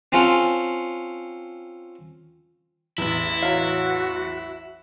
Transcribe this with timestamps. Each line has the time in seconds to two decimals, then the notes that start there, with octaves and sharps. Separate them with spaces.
0.12 C4 C#4 F4 A4 F#5
2.98 A1 E2 E4
3.42 F#3 F#4 F5